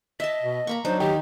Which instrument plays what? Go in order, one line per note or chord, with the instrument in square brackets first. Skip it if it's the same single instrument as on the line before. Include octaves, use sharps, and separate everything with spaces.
[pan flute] D#5 [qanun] E5 A5 [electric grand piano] B6
[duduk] B2
[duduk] A#3 [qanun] A#5 B5 C#6
[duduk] F#3 [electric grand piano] D4 [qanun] D#4 [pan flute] C5
[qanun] D#3 [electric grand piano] D#4 G5 [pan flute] G4